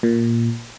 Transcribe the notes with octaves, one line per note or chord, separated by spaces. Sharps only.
A#2